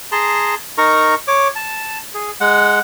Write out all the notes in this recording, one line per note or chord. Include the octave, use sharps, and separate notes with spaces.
G#4 A5 A#5 C6
D#4 A#4 A#5 C#6
C#5 D6
A5
G#4
G#3 F#5